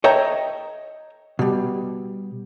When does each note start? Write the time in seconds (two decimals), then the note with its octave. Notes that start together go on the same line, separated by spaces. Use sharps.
0.04 A4 C#5 D#5 E5 G5 A#5
1.39 B2 G3